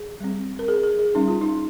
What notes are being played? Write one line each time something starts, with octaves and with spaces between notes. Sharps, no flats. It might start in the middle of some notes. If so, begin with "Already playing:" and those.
Already playing: G#4
G3 C4
A#4
G#4
G#4
G#4
G3 C#4 D#4
F4
D#4